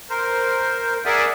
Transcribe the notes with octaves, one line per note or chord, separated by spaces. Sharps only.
A#4 C5
G#4 A#4 D5 E5 F#5 G#5